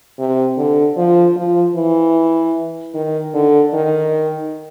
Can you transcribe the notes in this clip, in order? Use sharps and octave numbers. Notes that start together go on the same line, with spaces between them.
C3
D3
F3
F3
E3
D#3
D3
D#3